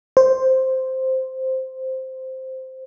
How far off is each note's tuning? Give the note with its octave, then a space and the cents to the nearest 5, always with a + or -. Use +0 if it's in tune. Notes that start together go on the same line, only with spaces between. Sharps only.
C5 +0